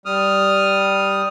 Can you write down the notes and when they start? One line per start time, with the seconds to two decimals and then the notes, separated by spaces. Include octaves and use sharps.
0.06 G3 D#6 F6